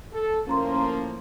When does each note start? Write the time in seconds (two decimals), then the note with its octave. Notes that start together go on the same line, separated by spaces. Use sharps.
0.13 A4
0.47 A2 F3 A#3 C#4 A#5 C6